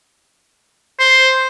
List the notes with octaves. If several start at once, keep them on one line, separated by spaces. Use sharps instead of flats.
C5